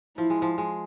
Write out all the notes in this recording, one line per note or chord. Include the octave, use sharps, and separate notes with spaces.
F3 E4
G#3
F3
G#3